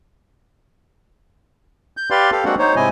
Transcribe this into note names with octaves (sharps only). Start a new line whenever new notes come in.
G6
G4 B4 D5 F5 C6
G4 A4 F5
G#3 A#3 C4 D4 F#4 F#5
D#4 C5 C#5
G#2 C3 E4 D#5 G#5